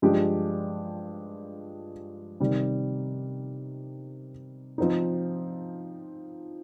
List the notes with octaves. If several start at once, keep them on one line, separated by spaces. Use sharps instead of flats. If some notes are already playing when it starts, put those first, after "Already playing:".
G2 F3 G#3 D4 G4
C3 D#3 G3
F3 C4 D#4